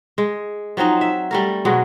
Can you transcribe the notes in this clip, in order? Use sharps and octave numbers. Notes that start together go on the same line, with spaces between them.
G#3
F3 F#3 C4 D#4
E5
G3 A3 A#4
B2 F#3 G#3